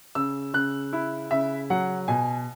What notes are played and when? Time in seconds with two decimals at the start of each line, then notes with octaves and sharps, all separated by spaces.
0.15 C#3 E6
0.54 C#3 F#6
0.93 E4
1.31 C#3 E5
1.70 F#3 F#5
2.08 B2 G#5